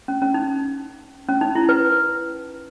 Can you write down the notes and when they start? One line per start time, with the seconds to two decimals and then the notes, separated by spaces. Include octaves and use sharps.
0.08 C#4
0.22 C#4
0.34 D#4
1.29 C#4
1.41 D#4
1.55 E4
1.69 B4